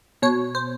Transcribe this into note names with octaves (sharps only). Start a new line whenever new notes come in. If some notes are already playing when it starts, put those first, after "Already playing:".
B2 C#5
C5